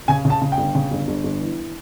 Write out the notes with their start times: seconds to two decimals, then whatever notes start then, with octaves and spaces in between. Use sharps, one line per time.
0.08 C#3 G#5
0.25 C#3
0.30 A5
0.41 C#3
0.52 G5
0.58 G1
0.75 C#3
0.91 G1
1.08 G1
1.24 G1
1.41 E3